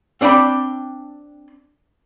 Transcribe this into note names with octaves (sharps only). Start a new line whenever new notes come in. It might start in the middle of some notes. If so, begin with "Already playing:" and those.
C4 D4 D5 G5 B5